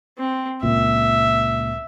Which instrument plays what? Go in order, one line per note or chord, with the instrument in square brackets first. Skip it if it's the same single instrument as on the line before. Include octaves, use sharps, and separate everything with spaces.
[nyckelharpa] C4
[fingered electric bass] C#2 A#2 [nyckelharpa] E5